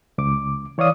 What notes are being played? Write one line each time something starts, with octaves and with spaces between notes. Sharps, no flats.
C#2 D6
E3 C#5 D5 F5 D#6